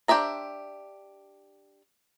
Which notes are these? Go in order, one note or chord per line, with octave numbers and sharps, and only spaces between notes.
D4 G4 C5 E5 A#5